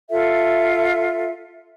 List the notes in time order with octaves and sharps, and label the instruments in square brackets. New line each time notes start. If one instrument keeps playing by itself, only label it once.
[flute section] F4 A4 E5